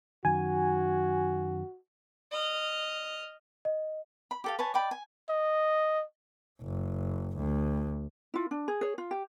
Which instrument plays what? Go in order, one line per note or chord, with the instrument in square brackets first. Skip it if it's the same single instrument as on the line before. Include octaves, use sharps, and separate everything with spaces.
[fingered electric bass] F#2 D#3 [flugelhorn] F#4 [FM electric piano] G#5
[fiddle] D#5 F6
[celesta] D#5
[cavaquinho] B5
G4 A4 F5
B4 C#5 G#5 A5
D5 D#5 G5 B5
G#5
[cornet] D#5
[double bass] F#1
D2
[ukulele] E4 F4
D4
G#4
G#4 C#5
F4
G4